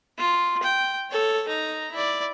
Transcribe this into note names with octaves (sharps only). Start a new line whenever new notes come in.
F4
G5
A4 C#5
D#4 A#5
E4 D5